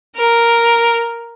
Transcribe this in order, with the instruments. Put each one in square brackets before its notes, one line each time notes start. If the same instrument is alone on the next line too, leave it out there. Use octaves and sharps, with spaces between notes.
[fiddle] A#4